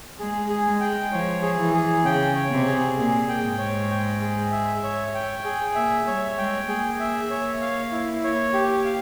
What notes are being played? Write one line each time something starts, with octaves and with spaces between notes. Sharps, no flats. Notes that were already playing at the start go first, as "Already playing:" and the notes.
G#3 G#4
G#4
G#3
G5
F3 C#5
G#4
E3
G#4
C#3 G5
C#5
C3
G#4
A#2 G#4
G5
G#2
C#5
G5
G#4
E5
C#5
G5
G#4
A#2 E5
G3 C#5
G#3 G5
A#3 G#4
E5
C#5
F5
E4
C#5
G4
F5